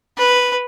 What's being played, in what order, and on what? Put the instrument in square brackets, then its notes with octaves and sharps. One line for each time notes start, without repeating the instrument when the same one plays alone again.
[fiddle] B4